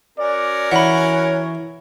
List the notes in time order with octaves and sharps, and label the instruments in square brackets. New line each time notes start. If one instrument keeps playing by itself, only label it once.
[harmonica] C#4 F#4 A#4 [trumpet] D5
[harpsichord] E3 [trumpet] C#5 [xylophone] F#5 B5